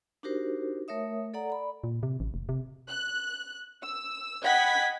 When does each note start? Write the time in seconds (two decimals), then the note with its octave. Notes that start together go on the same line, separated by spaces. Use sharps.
0.23 D4 D#4 F#4 G4 A#4 C5
0.88 A3 A#4 C#5 E5 D#6
1.34 A4 D5 F#5 A#5
1.50 D5 B5
1.84 A#2
2.03 C3
2.20 A1
2.34 F1
2.49 C3
2.89 F#6
3.82 E6
4.42 D#5 F#5 G5 B5 G#6 B6